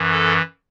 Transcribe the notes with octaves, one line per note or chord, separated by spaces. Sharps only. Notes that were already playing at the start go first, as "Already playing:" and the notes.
Already playing: F#2 E3
A4